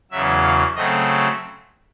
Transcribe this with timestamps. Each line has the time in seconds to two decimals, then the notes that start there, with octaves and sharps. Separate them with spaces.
0.11 E2 C#3 F#3 E5
0.43 F5
0.75 C#3 F#3 A3 C4 D#5